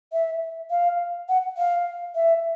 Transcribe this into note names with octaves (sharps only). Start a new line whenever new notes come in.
E5
F5
F#5
F5
E5